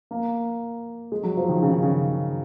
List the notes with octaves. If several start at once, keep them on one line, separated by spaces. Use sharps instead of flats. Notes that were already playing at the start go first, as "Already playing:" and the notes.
A#3
G#3
F#3
F3
D#3
C#3
D#3
C#3